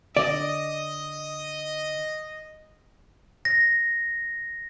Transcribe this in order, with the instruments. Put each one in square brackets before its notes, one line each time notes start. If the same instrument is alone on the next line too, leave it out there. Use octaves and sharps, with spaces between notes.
[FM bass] D3 [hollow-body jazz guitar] D5 [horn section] D#5
[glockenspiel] A#6